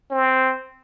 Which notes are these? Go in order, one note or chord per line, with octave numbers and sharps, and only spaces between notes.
C4